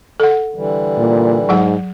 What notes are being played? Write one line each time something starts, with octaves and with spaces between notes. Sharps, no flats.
A4 F#5
D3 E3 G3
A#2
G#2 F#3 G#4 F#5